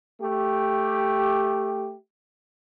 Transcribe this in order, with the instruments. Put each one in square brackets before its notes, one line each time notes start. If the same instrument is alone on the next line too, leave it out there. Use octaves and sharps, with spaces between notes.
[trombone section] A3 G4